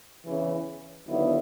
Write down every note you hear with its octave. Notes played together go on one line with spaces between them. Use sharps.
E2 C#3 E3
D#2 D3 F#3 B3 E4